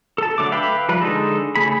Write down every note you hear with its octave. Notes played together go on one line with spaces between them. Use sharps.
A4 A5
D3 F#3 A3 D6
B4 E5 F5 G5 B5
F3 G3 B4
D3 G#3 D#4 A4
C#3 A3 G#4 B5